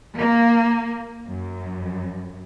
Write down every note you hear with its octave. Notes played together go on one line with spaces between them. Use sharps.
A#3
F#2